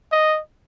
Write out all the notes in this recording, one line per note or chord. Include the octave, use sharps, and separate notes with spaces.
D#5